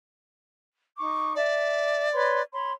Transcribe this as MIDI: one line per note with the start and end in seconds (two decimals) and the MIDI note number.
0.97 1.34 63
0.97 1.34 85
0.97 1.34 86
1.35 2.42 74
1.35 2.08 76
1.35 2.08 81
2.12 2.39 71
2.12 2.39 73
2.12 2.39 84
2.52 2.71 73
2.52 2.71 83
2.52 2.71 84